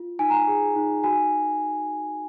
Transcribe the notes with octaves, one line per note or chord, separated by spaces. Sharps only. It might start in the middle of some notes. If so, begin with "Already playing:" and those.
Already playing: F4
D#4 G#5
A#5
G#5
G#4
D#4
F#4 G#5